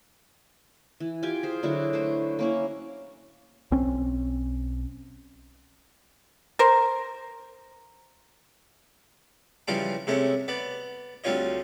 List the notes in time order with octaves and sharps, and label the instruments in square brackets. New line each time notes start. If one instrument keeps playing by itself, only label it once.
[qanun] E3
F4 G4 G5 G#5
G#4 C5
D3 F#3 E4 F#4
A3 B4 C5
A#3 C#4 E4
[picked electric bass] B1 C4 C#4
[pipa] A#4 C5
[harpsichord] C#3 E3 F3 G3 C6 D6
C3 G#3 A3 C#4
B3 D5
D2 G3 C4 F4 C#5 D#5